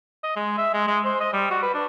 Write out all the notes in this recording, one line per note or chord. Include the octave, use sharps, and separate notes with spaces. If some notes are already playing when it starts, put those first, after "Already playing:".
D#5
G#3
E5
G#3
G#3
C5
D#5
G3
F#4
B4
D4